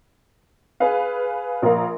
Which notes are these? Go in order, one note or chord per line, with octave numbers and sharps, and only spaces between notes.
G#4 B4 F5
A#1 A#4 F5